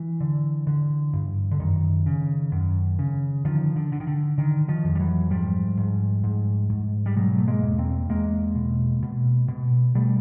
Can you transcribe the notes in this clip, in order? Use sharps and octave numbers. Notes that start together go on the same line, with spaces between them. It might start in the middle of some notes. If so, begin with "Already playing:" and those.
Already playing: E3
D3
D3
G2
D3
F#2 D#3
C#3
F#2
C#3
D3 D#3 F3
D3
D3
D#3
D3
D3 D#3
D#3 F3
F2
G3
E3 F#3
G#2 F3 G3
G#2
G#2
G#2
G3
B2 F#3 G#3
A3
G#3 A#3
E2
A#3 C4
E2 G#3 A#3
B2
B2
B2
B2 G3 A3